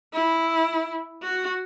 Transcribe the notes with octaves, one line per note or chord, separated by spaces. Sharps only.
E4
F#4